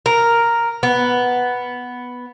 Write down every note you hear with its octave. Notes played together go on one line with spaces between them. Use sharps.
A#4
B3